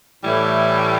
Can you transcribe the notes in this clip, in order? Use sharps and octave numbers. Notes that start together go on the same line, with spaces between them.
A2 E3 G3 A3 E4